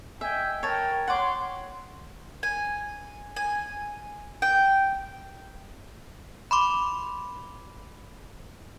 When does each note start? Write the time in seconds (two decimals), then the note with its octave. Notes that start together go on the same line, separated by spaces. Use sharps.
0.21 D#5 E5 G5 G#5
0.63 A#4 C#5 G5 A5
1.08 C#5 F#5 C6 D6
2.43 G#5
3.36 G#5
4.42 G5
6.51 B5 C6 D6